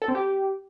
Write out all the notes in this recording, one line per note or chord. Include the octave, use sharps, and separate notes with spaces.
A4
C4
G4